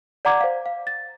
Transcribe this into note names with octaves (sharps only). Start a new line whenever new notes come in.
D5 F#5 A#5 D6 G#6
C5 F5
F5
A6